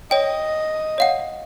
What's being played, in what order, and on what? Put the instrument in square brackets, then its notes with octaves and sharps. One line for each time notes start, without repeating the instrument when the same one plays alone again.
[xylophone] C#5 G5 [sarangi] D#5
[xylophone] C#5 F5 F#5